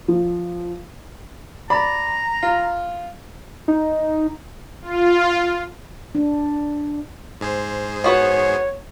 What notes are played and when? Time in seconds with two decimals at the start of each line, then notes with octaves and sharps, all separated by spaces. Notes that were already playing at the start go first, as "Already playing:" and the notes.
0.08 F3
1.70 D5 A#5 B5
2.43 F4
3.68 D#4
4.81 F4
6.15 D4
7.41 G#2 G#4 C5
8.04 B3 F#4 B4 C#5